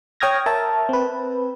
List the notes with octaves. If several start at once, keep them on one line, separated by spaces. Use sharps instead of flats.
C#5 G5 D#6 F6 G#6 A#6
A#4 E5 A5
C4 B4